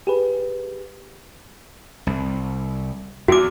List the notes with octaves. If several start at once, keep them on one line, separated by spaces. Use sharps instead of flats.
G4 G#4 B4
C2
E2 F#4 D6